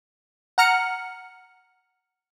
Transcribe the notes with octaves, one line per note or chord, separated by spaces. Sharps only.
F#5 A#5 F6 C#7